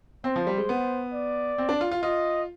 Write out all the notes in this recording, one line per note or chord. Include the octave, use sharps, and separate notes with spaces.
C4 C5
F3
G3
G#3
B3
D5
C4
D4
F4
F4
F4 D#5